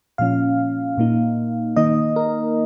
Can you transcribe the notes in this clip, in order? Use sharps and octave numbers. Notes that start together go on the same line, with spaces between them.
A#2 F3 C#4 F5
A#2 A#3 D#4
D#3 A#3 D#4 D#5
A#4